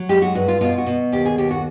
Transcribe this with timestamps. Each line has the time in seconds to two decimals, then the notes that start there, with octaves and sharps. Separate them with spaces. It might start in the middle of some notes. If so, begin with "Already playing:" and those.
Already playing: F#3
0.09 G#3 G4
0.22 F#4
0.35 G2 F#4
0.48 F4
0.61 B2 F4
0.78 F#4
0.86 B2
1.12 D#2 G4
1.25 G#4
1.38 D#2 G4
1.51 F#4